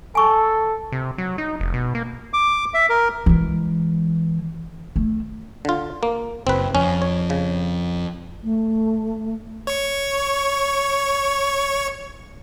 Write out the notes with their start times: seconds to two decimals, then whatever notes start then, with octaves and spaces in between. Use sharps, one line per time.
0.15 A4 G#5 C#6
0.92 C3
1.18 F#3
1.38 D#4
1.60 F1
1.74 B2
1.95 A#3
2.33 D6
2.74 E5
2.89 A#4
3.26 E3 G#3
4.96 A3
5.65 D3 F4
6.03 A#3
6.47 F#1 C4 B4
6.75 F2 C#4
7.02 C#5
7.30 C#3
8.43 A3
9.67 C#5 C#6